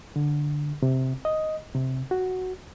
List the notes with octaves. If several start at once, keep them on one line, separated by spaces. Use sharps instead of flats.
D3
C3
D#5
C3
F#4